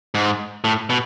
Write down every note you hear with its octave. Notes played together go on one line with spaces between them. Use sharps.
G#2
A2
B2